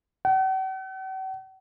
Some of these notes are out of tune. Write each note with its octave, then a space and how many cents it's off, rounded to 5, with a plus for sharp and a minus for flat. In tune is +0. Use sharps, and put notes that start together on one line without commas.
F#5 +45